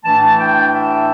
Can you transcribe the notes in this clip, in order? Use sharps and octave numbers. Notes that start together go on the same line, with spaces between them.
A2 E3 A3 D4 A5
G5
E5